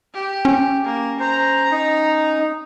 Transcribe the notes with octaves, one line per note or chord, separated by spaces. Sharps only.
G4
C#4
A#3
C5 A#5
D#4